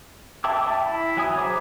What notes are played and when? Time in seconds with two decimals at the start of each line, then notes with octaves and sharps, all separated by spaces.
0.44 E5 G5 A5 D6 E6
0.65 E5 G5 A5
0.86 E4
1.17 F#3 G#5 D#6
1.38 G#4 C5 E5 A#5 D6